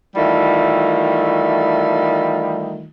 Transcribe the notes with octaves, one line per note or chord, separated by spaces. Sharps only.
D#3 E3 G3 A3 F4